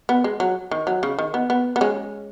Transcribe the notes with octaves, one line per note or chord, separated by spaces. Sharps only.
B3
G#3
F#3
D#3
F#3
C#3
D#3
B3
B3
B3
G#3 C#4